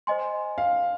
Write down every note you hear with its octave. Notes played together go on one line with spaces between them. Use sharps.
C5 D#5 G#5 C6
F5